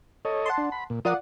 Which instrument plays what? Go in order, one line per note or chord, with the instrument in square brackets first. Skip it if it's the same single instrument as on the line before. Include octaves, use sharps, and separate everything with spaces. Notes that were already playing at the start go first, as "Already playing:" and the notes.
[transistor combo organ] A4 C#5 D#5
[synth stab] F#5 A5 C6
[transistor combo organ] D4
B5
A#2
[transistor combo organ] F3 A#4 D#6 [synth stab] F4 D5 F#5